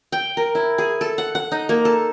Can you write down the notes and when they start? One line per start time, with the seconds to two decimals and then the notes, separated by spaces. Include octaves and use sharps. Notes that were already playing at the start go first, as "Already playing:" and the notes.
0.12 G5
0.37 A#4
0.55 E4
0.78 G#4
1.01 A4
1.18 F#5
1.35 F#5
1.52 D#4
1.69 A#3
1.85 A4